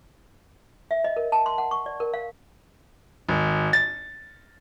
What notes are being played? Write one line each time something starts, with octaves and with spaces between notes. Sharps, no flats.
E5
D#5
A#4
A5
C6
F#5
C#6
D5
A#4
F5
G#1
A6